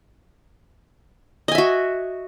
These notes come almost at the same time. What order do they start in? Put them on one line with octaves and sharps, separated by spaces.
D#5 G#5 E5 F#4